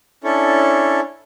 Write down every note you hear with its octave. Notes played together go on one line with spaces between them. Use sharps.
C#4 D4 E4 A4 C#5